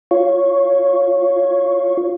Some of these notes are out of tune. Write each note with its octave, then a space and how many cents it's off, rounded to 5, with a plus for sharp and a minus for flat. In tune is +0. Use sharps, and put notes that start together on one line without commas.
F4 +0 C#5 +0